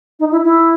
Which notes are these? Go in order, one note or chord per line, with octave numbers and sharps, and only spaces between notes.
D#4
E4
E4